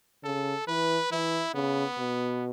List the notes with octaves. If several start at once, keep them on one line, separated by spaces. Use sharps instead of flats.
C#3 A4
E3 B4
E3 E4
C#3 B3
B2